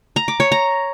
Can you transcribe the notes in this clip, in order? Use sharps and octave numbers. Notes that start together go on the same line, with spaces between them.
A#5
D6
C#5
A#5